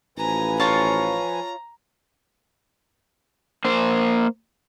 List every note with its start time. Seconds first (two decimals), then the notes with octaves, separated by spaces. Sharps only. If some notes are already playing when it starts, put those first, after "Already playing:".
0.18 A1 F3 B4 G#5 A#5
0.60 F4 C#5 A5 A#5
3.65 A#3 C5